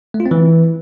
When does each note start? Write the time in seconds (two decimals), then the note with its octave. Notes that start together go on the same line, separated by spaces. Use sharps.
0.14 A3
0.20 F4
0.26 C4
0.31 E3